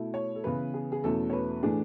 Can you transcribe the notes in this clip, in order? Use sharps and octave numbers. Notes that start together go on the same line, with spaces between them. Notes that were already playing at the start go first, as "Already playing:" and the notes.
Already playing: B2 A3 E4
C#5
A4
C#3 E3 B3 B4
G#4
G#4
E2 B2 A3 C#4 E4 A4
C#5
B4
A2 E3 A3 D4 G#4